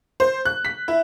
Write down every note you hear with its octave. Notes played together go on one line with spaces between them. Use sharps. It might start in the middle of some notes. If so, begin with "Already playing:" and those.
C5
F#6
B6
E4